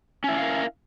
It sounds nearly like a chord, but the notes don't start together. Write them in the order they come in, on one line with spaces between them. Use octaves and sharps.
C#4 E4 D4 F5 A#4